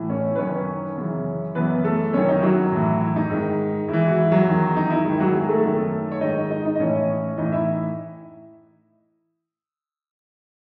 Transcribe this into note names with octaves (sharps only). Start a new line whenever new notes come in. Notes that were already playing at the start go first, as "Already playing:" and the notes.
Already playing: A2 E3
C#4 C#5
B4
F#2 D#3 C#4 C#5
F#2 C#3 E3
F#2 E3 B3 B4
A3 A4
F#2 D#3 C#4 C#5
D#4
E4
F#3 F#4
A2 E3
E4
D#4
G#2 D#3
G#2 E3 E4
F#4
E4
F#3 F#4
E2 D#3
D#4
E4
G#2 D#3 E4
F#3 F#4
G#3 G#4
A3 A4
F#2 D#3
C#5
G#2 D#3 D#4 D#5
D#4 D#5
D#4 D#5
D#5
A2 E3 C#4 C#5
A2 E3 D#4 D#5
E4 E5